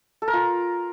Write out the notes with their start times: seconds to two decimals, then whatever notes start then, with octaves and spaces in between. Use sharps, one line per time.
0.22 A4
0.28 A#4
0.33 F4